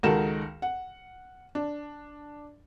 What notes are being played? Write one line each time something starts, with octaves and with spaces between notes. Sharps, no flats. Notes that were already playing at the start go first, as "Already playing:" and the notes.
C#2 D#3 F#4 A4 A#4 E7
F#5
D4